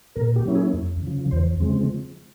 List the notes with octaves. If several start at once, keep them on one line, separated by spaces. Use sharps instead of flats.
A#2 A#4
G4
F#3 A#3 C#4 E4
G#4
F2
C#3 F3
E2 C5
C#3 F3 G#3 C4